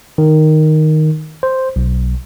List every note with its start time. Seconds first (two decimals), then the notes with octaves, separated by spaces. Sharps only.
0.18 D#3
1.43 C5
1.76 B1